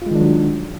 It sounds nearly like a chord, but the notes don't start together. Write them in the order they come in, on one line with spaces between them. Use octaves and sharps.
F4 G#3 D#3 D4 F#3